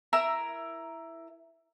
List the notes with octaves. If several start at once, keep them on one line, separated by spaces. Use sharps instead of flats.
E4 A#4 A#5 E6